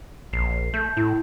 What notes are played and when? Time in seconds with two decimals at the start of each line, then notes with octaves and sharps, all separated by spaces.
0.33 A#1 C7
0.74 A3 G6
0.97 A2 E4